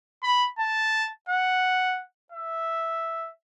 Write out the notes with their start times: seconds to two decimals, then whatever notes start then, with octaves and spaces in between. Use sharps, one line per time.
0.23 B5
0.59 A5
1.29 F#5
2.32 E5